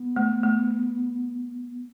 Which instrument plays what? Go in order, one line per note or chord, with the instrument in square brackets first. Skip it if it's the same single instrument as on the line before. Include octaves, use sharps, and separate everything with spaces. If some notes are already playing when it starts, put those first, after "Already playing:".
Already playing: [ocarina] B3
[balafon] A3
A3